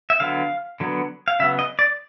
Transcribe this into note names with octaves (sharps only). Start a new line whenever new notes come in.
E5
D3 F#3 B3 F5
D3 F#3 B3
F5
C#3 F#3 B3 E5
D#5
D5